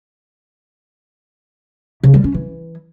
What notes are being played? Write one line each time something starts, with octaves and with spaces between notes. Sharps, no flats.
C#3
G3
C#4
E3